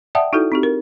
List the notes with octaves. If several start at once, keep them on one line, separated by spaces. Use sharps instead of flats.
D5 E5 F#5 G5 A5 D#6
D#4 E4 F#4 A4
C4 D#4 G4
A#4